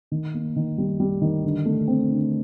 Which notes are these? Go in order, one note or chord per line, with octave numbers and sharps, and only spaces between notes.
D#3
A#3
D#3
G3
G3
D#3
D3
A3
C4
D3